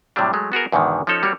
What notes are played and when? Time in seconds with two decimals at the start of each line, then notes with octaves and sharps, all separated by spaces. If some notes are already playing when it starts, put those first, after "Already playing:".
0.16 A2 C3 F#3 G3 D4
0.33 F#3 G#3 A3
0.52 B3 F#4 G#4 A#4
0.72 E2 G#2 B2 D3 D#3
1.07 F3 C#4 D#4 A4 C#5
1.23 G3 A#3 F#4 C#5